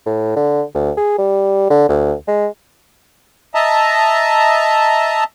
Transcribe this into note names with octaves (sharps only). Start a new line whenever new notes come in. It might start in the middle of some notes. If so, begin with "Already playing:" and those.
A2
D3
D2
G#4
G3
D3
D2
G#3
D#5 E5 A5 A#5